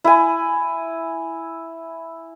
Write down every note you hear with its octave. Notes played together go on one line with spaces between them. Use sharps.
E4 G#5